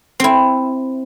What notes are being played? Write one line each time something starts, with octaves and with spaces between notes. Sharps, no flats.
C4 E4